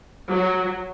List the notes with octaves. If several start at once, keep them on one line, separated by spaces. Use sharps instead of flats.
F#3